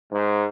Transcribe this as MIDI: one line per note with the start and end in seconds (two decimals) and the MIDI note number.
0.12 0.46 44